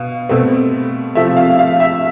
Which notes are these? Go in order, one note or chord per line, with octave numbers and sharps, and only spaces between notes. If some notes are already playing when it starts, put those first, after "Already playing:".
Already playing: B2 F5
B2 A3 C4
C3 F3 A3 E5
F5
F5
E5